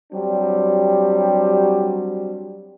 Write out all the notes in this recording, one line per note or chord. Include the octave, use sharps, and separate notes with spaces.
F#3 G3 C4 D4 G4